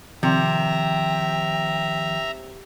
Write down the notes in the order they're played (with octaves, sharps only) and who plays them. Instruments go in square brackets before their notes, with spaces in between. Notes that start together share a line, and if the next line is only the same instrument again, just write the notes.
[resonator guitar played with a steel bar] C3 [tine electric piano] D#3 F3 [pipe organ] E5 A#5 [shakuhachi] G5